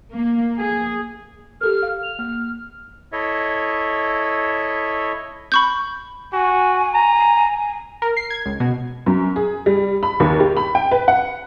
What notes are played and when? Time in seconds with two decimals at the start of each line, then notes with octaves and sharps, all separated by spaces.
0.12 A#3
0.61 G#4
1.61 G4 A4 A#4 F6
1.83 F5
2.03 F7
2.19 A#3 F6
3.12 E4 A4 C#5 D#5 E5
5.52 B5 C#6 G6
6.33 F#4 G#5
6.94 A#5
8.02 A#4
8.17 C7
8.30 G#6
8.46 C#2
8.60 B2
9.06 F#2
9.36 G#4
9.66 G3
10.03 B5
10.20 D#2
10.40 G4
10.57 B5
10.75 G5
10.91 B4
11.08 F#5